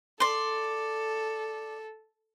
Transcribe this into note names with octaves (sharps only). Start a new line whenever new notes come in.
A4 D5 C6